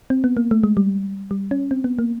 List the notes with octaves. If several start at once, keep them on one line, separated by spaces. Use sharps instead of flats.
C4
B3
A#3
A3
G#3
G3
G3
C#4
C4
B3
A#3